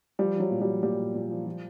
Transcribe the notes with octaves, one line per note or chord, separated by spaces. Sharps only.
F3 G3
F3 F#3
A#2
G3
F3
A#2 G3
A#2
A#2
F3
F3